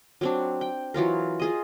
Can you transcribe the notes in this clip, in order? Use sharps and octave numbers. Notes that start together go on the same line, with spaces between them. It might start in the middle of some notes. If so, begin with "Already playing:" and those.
F#3 C4 D4
G5
E3 F#3 F4 A#4
F4 G#4 D#5